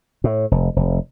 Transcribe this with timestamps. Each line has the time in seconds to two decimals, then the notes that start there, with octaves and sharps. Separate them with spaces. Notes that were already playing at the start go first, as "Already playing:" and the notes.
0.24 A2
0.51 F1
0.76 F1